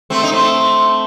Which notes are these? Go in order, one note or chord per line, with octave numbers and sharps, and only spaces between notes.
A3 C4
D#4
A3 C4